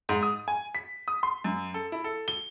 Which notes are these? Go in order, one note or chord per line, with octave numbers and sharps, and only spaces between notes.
G#2
D#6
G#5
B6
D#6
C6
F#2
A4
E4
A4
G7